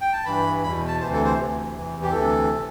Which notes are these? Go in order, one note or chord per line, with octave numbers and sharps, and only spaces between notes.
G5
A5
G2 E3 B5
E2 B2 B5
A5
D2 C3 E3 C5
A4
C5
D2 C3 E3
E2 C3 E3
G4
D2 C3 E3 A4
E3